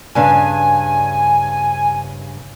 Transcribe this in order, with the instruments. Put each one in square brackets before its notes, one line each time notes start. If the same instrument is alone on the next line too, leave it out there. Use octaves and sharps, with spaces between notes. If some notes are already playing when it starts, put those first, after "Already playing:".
[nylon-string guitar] G2 C#3 D4 [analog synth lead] G#5